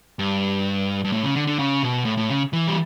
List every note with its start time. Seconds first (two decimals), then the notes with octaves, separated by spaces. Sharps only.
0.19 G2
1.05 G2
1.12 A2
1.23 C#3
1.36 D3
1.47 D3
1.59 C#3
1.83 B2
2.05 A2
2.17 A2
2.30 C#3
2.53 E3
2.67 G3